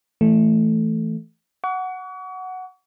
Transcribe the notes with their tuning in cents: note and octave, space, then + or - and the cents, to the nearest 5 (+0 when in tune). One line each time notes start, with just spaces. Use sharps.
E3 +0 A3 +0
F#5 +0 C#6 +40